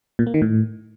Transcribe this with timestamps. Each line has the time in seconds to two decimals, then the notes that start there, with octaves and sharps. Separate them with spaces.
0.19 A#2
0.27 A#3
0.34 D#3
0.42 A2